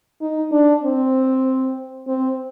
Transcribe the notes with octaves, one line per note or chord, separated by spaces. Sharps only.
D#4
D4
C4
C4